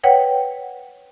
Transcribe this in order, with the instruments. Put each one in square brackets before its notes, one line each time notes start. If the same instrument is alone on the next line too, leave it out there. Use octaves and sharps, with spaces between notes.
[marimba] B4 C#5 F#5 G5